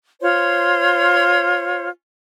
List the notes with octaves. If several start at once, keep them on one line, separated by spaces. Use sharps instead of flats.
F4 C5 C#5